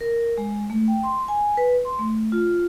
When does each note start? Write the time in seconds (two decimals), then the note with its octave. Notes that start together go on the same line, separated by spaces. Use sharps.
0.01 A#4
0.38 G#3
0.70 A3
0.88 G5
1.03 C6
1.28 G#5
1.57 B4
1.85 C6
1.99 A3
2.32 F4